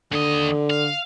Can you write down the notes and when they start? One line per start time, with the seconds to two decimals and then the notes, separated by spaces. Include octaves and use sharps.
0.12 D#2 D3 D#5
0.70 F5